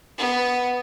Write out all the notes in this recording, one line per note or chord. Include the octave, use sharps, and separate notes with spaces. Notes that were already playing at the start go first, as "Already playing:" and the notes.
B3